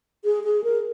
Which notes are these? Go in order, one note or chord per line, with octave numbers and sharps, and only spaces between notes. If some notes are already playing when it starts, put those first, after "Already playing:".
G#4
G#4
A#4